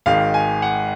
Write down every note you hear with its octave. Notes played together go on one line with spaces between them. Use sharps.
G#1 G#2 D#3 F5
G#5
F#5